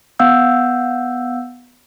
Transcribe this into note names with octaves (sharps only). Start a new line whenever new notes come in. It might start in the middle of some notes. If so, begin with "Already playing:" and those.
B3 F5 F#5 E6 G6